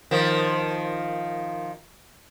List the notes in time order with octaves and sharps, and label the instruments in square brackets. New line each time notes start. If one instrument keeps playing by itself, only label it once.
[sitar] D#3 F3